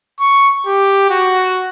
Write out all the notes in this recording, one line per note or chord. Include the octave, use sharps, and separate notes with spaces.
C#6
G4
F#4